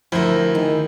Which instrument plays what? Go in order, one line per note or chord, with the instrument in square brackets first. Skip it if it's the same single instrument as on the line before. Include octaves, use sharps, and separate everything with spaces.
[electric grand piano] D2 E4 C5 [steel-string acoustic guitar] F3 A#4
[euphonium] D#3 [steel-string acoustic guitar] G#4